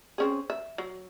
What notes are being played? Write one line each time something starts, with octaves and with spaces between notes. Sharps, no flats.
C4 C#4 G#4
E5
F#3